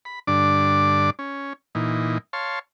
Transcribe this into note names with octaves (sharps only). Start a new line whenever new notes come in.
B5
G2 D3 D4 D5 D6
C#4
A#2 E3 D#4
C#5 F5 A5 C6